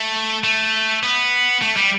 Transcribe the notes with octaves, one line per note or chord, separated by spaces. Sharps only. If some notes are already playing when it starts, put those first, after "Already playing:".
Already playing: A3
A3
B3
A3
G3